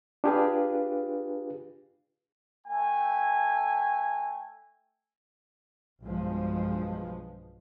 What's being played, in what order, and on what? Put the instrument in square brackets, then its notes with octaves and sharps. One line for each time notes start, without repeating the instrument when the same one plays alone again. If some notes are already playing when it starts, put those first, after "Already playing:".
[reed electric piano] D4 F4 G4 G#4 B4 F5
[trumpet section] A3 G5 G#5
[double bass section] B1 G2 B2 F3 G#3